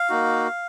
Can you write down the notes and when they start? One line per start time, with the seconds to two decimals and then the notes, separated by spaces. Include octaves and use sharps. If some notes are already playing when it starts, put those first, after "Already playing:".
Already playing: F5
0.09 A#3 D#4 F#4